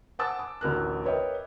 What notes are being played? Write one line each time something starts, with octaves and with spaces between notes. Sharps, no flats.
F#5 G#5 A5 D6 E6 A6
D6
A1 D2 A#4 F#6
A#4 B4 C#5 D#5 E5 G5